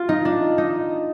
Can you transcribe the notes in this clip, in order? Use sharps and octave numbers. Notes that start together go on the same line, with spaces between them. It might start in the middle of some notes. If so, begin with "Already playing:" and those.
Already playing: F4
D#4
D4
D#4